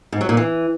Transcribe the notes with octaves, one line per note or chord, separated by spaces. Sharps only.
G#2
F#3
A#2
E3